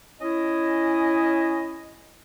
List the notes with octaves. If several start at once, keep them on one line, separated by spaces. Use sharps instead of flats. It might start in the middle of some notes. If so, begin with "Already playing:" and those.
C#4 E4 D#5